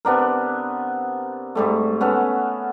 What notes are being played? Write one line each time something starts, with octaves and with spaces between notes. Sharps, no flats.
C3 B3 D4 A#4
G#2 G3 A3
B3 C#4 A4 F#5